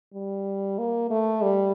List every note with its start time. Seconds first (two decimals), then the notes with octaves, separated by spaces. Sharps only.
0.14 G3
0.79 A#3
1.10 A3
1.43 G3